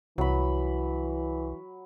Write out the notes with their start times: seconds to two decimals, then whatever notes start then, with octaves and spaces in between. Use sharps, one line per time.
0.18 C2 E3 F#3 B5